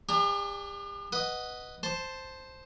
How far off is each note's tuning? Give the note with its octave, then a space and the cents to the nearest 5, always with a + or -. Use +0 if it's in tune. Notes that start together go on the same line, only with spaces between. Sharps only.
D4 +0 G4 +45 A#5 +10
B4 +0 D#5 +0 F#5 +0
C5 +0 A5 +0 C6 +0